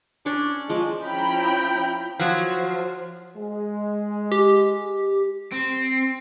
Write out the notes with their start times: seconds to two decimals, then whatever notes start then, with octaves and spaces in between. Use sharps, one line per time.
0.26 C#4 D4 C#5
0.70 F3 G#3 D5
1.03 F3 C#4 E4 G5 A#5 B5
2.19 F3 F#3
3.37 G#3
4.32 G4
5.52 C4